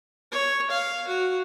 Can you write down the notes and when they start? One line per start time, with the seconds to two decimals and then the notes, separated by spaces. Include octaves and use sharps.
0.32 C#5
0.70 F5
1.08 F#4